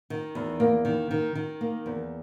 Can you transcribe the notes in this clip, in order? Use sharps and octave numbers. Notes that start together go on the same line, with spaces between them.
D#3
E2
A#3
D#3
D#3
D#3
A#3
E2